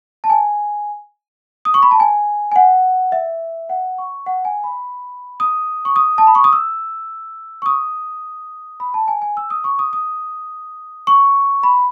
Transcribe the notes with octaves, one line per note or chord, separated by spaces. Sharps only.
A5
G#5
D#6
C#6
B5
A5
G#5
G#5
F#5
E5
F#5
C#6
F#5
G#5
B5
D#6
C#6
D#6
A5
B5
C#6
D#6
E6
C#6
D#6
B5
A5
G#5
G#5
E6
D#6
C#6
D#6
D#6
C#6
B5